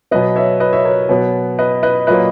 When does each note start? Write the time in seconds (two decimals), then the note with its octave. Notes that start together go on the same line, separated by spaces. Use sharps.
0.11 B2 F#3 B3 B4 D#5
0.36 C#5 E5
0.60 B4 D#5
0.73 C#5 E5
0.85 A#4 C#5
1.09 B2 F#3 B3
1.59 B4 D#5
1.83 B4 D#5
2.07 A#2 F#3 A#3 B4 D#5